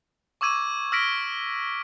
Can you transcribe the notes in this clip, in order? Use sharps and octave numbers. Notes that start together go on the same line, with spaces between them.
C#6 D6 E6 G#6 D#7
E6 F6 A#6 B6 D7